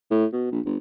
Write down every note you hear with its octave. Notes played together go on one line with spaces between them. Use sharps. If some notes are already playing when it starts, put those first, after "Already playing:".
A2
B2
A#1
G1